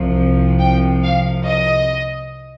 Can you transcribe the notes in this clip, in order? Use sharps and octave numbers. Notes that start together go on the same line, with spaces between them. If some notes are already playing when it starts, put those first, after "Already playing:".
Already playing: C2 C3 F3
G5
F5
D#5